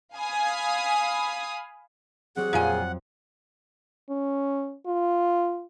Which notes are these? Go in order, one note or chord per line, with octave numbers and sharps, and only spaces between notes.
F5 G#5 B5 D#6
F#3 G3 C4 G#4 F#5
F2 A#2 F4 G#5
C#4
F4